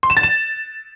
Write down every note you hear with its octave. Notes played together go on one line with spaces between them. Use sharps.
C6
E7
A6
E7